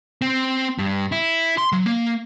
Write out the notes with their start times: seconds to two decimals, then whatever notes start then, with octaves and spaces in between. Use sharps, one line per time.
0.22 C4
0.79 G2
1.12 E4
1.58 C6
1.72 F#3
1.86 A#3